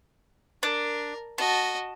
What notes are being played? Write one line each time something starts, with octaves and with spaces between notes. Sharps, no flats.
D4 A#4
F#4 D#5 A5